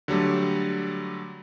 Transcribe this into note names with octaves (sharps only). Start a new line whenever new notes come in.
D3 F#3 G3 A3